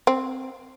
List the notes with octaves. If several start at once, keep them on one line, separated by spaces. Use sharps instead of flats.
C4